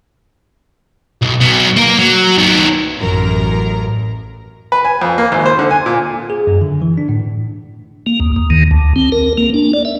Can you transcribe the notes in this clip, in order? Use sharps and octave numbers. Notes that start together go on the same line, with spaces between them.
B1
F#3 B3
A#3 A#4
F#3
D#3 B3
A1 F#2 A#4 A#5
B4
G#5
F2
A#3
G#1
C5
D3
G#5
A#2
G#4
F#2
D3
E3
D4
A2
A#3
D#2
D#2
D#3
D2
C4
A#4
A#3
D4
D5
E5